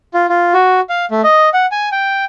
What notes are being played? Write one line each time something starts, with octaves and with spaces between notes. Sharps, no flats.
F4
F4
F#4
F5
A3
D#5
F#5
G#5
G5